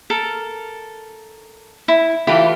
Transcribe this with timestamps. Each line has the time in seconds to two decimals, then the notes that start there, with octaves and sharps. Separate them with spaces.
0.10 A4 A#4
1.88 E4
2.27 E3 A3 E4 F4 G4 B5